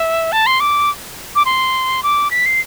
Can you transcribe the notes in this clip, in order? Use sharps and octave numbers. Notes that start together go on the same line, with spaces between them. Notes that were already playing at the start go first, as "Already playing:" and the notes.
Already playing: E5
A5
C6
D6
D6
C6
D6
B6
C7